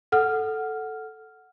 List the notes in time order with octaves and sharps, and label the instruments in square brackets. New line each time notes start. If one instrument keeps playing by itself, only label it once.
[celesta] A4 F#5 F6